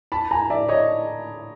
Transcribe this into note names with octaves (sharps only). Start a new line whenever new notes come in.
A5 B5
G#5 A#5
D5 E5
C#5 D#5